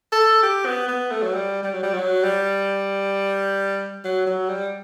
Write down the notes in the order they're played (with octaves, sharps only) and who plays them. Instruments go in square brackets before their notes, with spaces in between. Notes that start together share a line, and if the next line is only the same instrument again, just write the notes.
[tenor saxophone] A4
G4
B3
B3
A3
F#3
G3
G3
F#3
G3
F#3
G3
F#3
F#3
G3